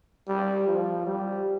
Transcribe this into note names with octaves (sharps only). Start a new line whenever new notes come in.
G3
F3
G3